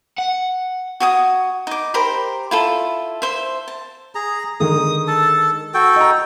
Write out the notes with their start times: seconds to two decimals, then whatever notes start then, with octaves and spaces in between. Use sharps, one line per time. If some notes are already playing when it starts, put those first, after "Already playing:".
0.19 F#5
1.00 F#4 G#5 D#6
1.67 D#4 D6
1.94 G4 A#4 C5 B5
2.51 E4 F4 A4
3.22 C5 E5
3.68 A5
4.15 G#4 A#5
4.60 D3 D#3 G#3 D#6
5.08 A4 A5
5.74 F#4 A4 G5
5.96 D#5 A#5